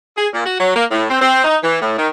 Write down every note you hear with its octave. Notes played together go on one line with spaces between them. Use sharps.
G#4
A#2
F#4
F#3
A#3
A2
C4
C4
D#4
E3
A2
D#3